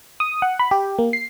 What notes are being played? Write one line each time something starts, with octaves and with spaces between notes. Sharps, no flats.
D#6
F#5
B5
G4
A#3
C7